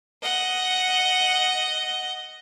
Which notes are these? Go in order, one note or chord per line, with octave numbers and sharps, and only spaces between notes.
D#5 F#5